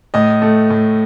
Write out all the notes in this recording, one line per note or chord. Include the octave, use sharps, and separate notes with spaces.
A2 D#5
A3
A2